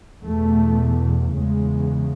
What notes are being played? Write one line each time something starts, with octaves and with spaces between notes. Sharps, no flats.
E2 B2 A3
E2 C#3 G#3